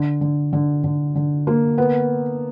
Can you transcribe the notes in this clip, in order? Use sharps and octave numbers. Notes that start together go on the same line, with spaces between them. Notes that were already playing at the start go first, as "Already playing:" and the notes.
Already playing: D3
D3
D3
D3
D3
A#3
B3